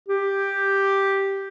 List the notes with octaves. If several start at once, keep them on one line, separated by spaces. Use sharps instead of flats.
G4